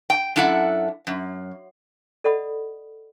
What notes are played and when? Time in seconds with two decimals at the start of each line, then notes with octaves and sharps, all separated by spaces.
0.10 G5
0.36 F#2 D4 E4 A4 F#5
1.07 F#2
2.24 A4 D5 D#5 F#5 B5 D#6